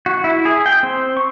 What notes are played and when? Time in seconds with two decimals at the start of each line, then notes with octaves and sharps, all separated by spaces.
0.06 F#4
0.24 E4
0.45 G#4
0.66 G5
0.83 C4
1.17 C#6